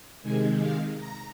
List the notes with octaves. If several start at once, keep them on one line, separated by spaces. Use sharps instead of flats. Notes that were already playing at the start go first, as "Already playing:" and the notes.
C3 D#3 G#3 G#5
F5
A#5